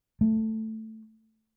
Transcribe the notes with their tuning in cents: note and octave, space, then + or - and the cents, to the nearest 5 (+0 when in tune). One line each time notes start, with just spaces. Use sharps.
A3 +5